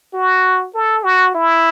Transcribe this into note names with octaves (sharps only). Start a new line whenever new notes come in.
F#4
A4
F#4
E4